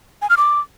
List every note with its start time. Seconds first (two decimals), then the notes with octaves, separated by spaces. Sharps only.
0.22 G#5
0.30 F6
0.37 D6